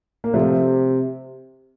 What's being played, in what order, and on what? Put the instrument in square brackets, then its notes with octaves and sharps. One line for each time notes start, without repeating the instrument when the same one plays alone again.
[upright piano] A#3
[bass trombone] C3 [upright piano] F3 A3